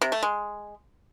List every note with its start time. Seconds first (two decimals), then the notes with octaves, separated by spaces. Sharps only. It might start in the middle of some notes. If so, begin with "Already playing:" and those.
0.01 C3
0.12 A3
0.23 G#3